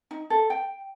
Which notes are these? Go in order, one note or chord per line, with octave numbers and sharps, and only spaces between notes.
D#4
A4
G5